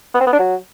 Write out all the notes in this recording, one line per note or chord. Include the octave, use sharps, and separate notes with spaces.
B3
C4
B3
D4
F#3